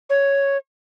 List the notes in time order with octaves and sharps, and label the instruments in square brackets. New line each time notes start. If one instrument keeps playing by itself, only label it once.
[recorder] C#5